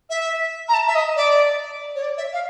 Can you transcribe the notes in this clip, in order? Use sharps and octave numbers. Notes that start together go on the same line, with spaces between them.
E5
A#5
A5
E5
D#5
D5
C#5
D5
E5
F5